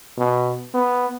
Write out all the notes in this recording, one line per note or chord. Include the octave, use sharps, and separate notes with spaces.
B2
B3